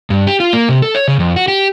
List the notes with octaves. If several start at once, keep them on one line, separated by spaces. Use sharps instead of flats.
G2
G4
F4
A#3
C3
A4
C#5
C#3
F2
F#4
G4